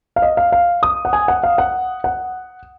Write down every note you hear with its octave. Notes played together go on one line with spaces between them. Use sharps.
F5
D#5
F5
F5
D#6
F#5
G#5
F#5
F5
F#5
F#5